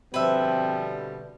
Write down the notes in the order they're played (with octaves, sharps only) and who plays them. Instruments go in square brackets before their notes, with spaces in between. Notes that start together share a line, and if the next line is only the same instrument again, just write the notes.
[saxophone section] B2 D3 G3 [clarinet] F3 [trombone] C4 [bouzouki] B4 E5